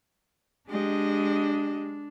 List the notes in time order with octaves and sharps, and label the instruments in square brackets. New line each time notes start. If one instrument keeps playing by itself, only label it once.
[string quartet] G#3 [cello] D4 [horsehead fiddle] G4 D#5